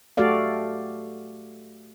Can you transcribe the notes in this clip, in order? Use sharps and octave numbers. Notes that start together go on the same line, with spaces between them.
A3 F#4 G4 A4 D5 F5